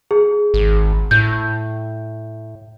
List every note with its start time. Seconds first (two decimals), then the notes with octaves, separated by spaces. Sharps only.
0.11 G#4
0.54 G#1
1.11 A2 G6